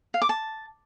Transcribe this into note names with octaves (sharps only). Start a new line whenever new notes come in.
F5
D6
A5